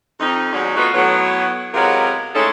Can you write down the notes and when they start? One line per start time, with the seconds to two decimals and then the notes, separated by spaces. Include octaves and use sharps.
0.20 F2 D#4
0.52 D#2 G#2 B2 F#3 D#4 D5
0.77 A3 B3 D#4 F4 F#4
0.94 A2 F#3 B3
1.74 C3 F#3 G#3 B3 F4 A#4
2.34 A2 G#3 A3 C#4 D#4 A4